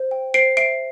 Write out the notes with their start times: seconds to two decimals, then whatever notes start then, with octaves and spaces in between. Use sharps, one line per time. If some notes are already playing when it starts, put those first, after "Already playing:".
Already playing: C5
0.11 G5
0.34 C5 C7 D7
0.57 E5 C7 D7